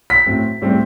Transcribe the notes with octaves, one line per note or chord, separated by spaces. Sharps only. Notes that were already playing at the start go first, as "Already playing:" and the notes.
B6
A2 F#3 C4
A2 G3 C4